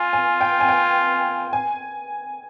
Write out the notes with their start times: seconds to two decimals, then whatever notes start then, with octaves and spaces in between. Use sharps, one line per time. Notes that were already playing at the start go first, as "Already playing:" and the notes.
Already playing: F4 G#5
0.13 G#5
0.41 G5
0.60 G#5
0.69 G5
1.53 G#5